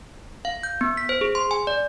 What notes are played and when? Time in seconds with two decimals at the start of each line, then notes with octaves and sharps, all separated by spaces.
0.45 F5
0.63 G6
0.81 B3
0.97 B6
1.09 C5
1.21 G#4
1.35 C6
1.51 G#5
1.67 D5